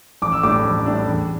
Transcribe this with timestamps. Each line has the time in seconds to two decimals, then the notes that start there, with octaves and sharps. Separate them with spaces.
0.22 A1 D6
0.32 E6
0.43 A2 G3 D4 D6
0.65 A1
0.86 A2 G3 D4
1.06 E2